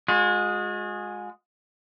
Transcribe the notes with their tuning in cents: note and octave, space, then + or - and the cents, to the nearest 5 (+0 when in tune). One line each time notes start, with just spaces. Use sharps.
G#3 +0 F#4 -45